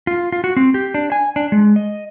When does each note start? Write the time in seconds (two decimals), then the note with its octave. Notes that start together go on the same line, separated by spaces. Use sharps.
0.07 F4
0.32 F4
0.44 F#4
0.57 C4
0.74 G4
0.94 D4
1.12 G#5
1.36 D4
1.52 G#3
1.76 D#5